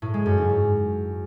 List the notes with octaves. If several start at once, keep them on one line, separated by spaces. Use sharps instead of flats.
A2
G#3
F#2
G#2
F#2